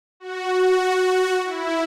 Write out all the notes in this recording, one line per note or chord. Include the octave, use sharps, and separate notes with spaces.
F#4
E4